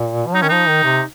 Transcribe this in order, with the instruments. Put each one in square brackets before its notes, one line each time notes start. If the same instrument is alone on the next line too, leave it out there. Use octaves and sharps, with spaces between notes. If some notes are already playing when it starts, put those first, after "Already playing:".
Already playing: [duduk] A#2
F3
[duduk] F#3 [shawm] D#4
[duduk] D#3 [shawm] C#4
[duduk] F3 [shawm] D#4
[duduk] D#3
C3